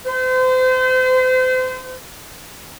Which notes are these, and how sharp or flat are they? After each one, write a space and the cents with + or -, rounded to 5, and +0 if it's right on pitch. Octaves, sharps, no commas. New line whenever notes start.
C5 -35